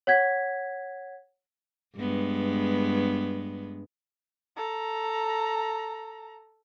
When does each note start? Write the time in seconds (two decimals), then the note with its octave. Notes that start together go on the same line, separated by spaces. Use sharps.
0.07 C#5 F#5 G#6 B6
1.98 G2 G#3 B3
4.57 A4 A#5